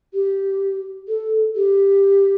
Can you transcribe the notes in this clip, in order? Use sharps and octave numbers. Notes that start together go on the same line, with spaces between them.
G4
A4
G4